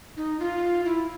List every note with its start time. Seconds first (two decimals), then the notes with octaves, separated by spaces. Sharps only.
0.17 D#4
0.40 F4
0.85 E4